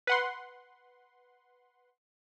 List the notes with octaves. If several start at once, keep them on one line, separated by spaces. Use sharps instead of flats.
B4 F#5 C6